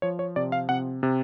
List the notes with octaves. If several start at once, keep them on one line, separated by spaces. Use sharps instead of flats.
F3 C#5
C#5
C3 D5
F5
C3 F#5
C3